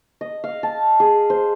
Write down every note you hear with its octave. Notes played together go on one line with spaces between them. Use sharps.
D#5
F5
A5
G#4
C5